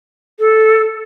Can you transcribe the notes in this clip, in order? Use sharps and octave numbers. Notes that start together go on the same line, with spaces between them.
A4